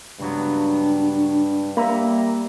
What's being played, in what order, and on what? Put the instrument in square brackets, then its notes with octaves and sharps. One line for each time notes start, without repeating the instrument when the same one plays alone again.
[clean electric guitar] C#2 F#3 B3 [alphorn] G2 [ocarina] D4
[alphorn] G3 [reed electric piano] A#3 [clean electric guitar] E5 A#5